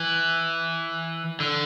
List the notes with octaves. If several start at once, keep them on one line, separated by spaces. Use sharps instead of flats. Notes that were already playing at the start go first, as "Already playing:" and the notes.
Already playing: E3
D3